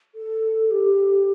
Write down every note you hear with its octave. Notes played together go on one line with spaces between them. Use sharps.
A4
A4
G4